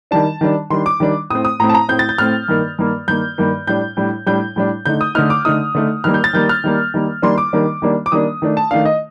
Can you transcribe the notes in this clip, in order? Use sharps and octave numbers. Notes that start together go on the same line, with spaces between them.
D#3 G3 D4 A5
D#3 G3 D4
D#3 G3 D4 C6
D6
D#3 G3 D4
A2 A3 C4 D#6
D#6
A2 A3 C4 A#5
A5
A#5
A2 A3 C4 G6
A6
G6
A2 A3 C4 F6
G2 D#3 A#3
G2 D#3 A#3
G2 D#3 A#3 G6
G2 D#3 A#3
A2 G3 D4 G6
A2 G3 D4
A2 G3 D4 G6
A2 G3 D4
D3 A3 D#4 G6
D#6
D3 A3 D#4 F6
D6
D3 A3 D#4 D#6
D3 A3 D#4
D#3 G3 A#3 F6
G6
A6
D#3 G3 A#3 G6
F6
D#3 G3 A#3
D#3 G3 A#3
D#3 G3 A#3 D4 C6
D6
D#3 G3 A#3 D4
D#3 G3 A#3 D4
D6
D#3 G3 A#3 D4 D#6
D#3 A3 D4
A5
D#3 A3 D4 F5
D#5